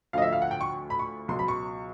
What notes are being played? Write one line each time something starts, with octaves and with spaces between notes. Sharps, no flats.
D2 D3 F3 D#5 F5
E5
F5
F#5
G5
C#6
B5
C#6
C#2 B2 F#3 C6
B5
C#6